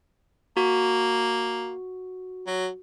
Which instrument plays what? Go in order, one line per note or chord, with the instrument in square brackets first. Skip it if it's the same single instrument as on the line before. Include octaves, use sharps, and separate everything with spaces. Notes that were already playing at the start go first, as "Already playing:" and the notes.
[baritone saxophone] A#3 [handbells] F#4
[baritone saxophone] F#3